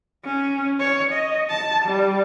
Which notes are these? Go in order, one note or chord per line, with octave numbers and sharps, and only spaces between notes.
C#4
C#5
D#5
A5
G3